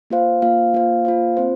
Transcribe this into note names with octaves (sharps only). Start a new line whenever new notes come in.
A#3 F4 C5 F5
A#3 F4 C5 F5
A#3 F4 C5 F5
A#3 F4 C5 F5
C4 F4 C5